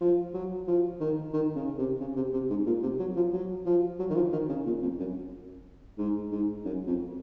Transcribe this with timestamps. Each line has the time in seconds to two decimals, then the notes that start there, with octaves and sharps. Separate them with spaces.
0.01 F3
0.34 F#3
0.67 F3
1.00 D#3
1.33 D#3
1.56 C#3
1.78 C3
2.00 C#3
2.16 C3
2.33 C3
2.50 G#2
2.66 A#2
2.83 C3
2.99 F#3
3.16 F3
3.33 F#3
3.66 F3
3.99 F#3
4.10 D#3
4.15 F3
4.33 D#3
4.49 C#3
4.66 A#2
4.82 F2
4.99 F#2
5.98 G#2
6.32 G#2
6.65 F#2
6.87 F2